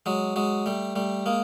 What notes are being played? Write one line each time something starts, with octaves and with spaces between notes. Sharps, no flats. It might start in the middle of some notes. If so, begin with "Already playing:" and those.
F#3 G#3
F#3 G#3
G3 A3
G3 A3
G#3 A#3